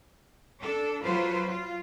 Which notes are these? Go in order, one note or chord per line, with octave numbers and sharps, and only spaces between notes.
D4 A4
F#3 F4 B4 C5
F4